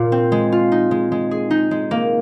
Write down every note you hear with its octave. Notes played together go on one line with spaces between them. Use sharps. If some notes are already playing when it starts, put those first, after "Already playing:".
Already playing: A#2 F4
C4
G#3
F4
D#4
G#3
G#3
G#4
D#4
G#3
A#3